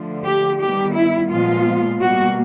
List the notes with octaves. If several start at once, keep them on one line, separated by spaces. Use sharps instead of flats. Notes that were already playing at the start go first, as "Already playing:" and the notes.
Already playing: D3 F3 A3
G4
D#3 G3 B3 G4
E4
A#2 F3 G#3 B3 F4
B2 G3 A#3 F#4